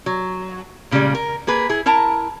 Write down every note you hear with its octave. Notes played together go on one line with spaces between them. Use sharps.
F#3
A#2 C#3 F3 G3 G#3
A#4
A#3 G#4 B4
E4 G#4
E4 A#4 A5 A#5